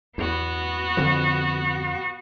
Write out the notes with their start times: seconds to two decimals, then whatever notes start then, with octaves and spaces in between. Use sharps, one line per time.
0.18 E2 B3 F#4
0.97 F2 D3 F3